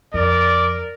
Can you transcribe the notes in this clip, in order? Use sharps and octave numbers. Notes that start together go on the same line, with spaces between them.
F2 A#4 D5